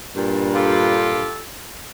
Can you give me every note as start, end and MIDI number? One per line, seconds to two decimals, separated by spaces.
0.15 1.24 43
0.15 1.24 46
0.55 1.43 65
0.55 1.43 67
0.55 1.43 69